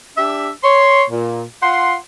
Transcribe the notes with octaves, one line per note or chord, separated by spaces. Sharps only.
D4 G4 E5
C#5 C6
A#2
F4 F#5 C6